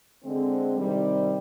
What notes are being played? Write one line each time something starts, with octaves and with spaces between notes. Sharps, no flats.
D3 G#3 C4
C3 D#3 G3